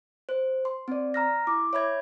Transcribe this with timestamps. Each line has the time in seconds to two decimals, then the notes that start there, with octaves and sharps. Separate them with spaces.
0.29 C5
0.65 C6
0.88 C4 D5
1.14 A#5 F6 A#6
1.47 E4 D6
1.73 C#5 E5 B5 G#6